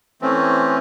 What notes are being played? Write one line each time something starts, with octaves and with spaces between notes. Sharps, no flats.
E3 A3 C4 C#4